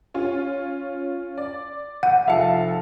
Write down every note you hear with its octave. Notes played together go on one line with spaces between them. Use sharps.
C#4 F4 C#5
D5
F#5
F1 F3 E5 F5 A5 C#7